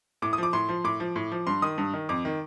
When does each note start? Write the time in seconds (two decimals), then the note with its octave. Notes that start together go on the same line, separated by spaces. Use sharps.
0.22 A2 D6
0.33 D#6
0.38 F3 D6
0.53 A2 C6
0.69 F3
0.84 A2 D6
1.00 F3
1.16 A2
1.32 F3
1.47 G2 C6
1.62 D#3 D#6
1.78 G2
1.93 D#3
2.09 F2 D6
2.25 D#3